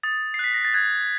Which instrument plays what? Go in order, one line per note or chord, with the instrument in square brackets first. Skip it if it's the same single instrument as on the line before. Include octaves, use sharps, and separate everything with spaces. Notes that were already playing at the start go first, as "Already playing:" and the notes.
[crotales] D#6 A6
C7
F#6 B6
A#6
A6
F#6 G#6